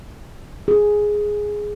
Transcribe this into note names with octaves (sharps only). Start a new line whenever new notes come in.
G#4